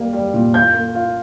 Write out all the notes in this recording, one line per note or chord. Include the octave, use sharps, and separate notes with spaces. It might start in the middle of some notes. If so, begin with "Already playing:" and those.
Already playing: G3 A#3
G3
A#2
F4 G6
A#3
F4